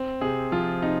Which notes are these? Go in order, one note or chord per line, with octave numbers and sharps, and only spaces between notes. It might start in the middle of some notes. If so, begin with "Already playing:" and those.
Already playing: C4
C3 G#4
F3 F4
C3 D#4